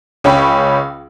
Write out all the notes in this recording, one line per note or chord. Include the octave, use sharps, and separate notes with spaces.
C#2 C#4 G5 B5 C#6